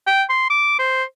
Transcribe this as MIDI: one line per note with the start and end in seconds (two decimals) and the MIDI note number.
0.07 0.23 79
0.29 0.48 84
0.50 0.77 86
0.79 1.03 72